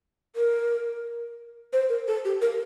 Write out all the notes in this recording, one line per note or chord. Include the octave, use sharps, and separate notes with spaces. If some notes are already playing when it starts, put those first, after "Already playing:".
A#4
C5
A#4
A4
G4
A#4